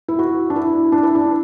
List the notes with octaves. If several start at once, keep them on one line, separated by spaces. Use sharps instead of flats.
E4
F#4
D4
E4
D4
E4
D4